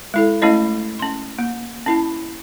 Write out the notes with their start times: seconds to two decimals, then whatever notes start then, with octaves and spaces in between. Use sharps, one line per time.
0.14 G#3 E4 A4
0.42 A3 C#4 E4 C#5 D#5
0.99 C#4 C6
1.39 A#3
1.86 C#4 E4 A5